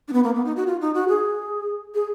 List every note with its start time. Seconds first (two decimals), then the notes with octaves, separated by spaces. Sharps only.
0.08 D4
0.13 B3
0.24 A#3
0.35 B3
0.45 D#4
0.56 F#4
0.67 F4
0.81 D#4
0.94 F#4
1.09 G#4
1.95 G#4